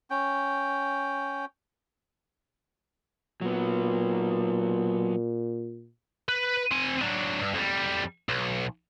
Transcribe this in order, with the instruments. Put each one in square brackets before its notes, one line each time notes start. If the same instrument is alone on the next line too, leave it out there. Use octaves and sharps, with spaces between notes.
[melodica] C#4 G5
[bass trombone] A#2 [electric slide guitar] F#3 B3
[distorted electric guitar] B4
C4 G#5
F#3 D4
G2
F2 G3
B1